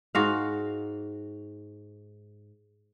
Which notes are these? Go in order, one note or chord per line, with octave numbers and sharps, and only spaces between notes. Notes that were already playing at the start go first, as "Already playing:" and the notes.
G#2 F#4 F5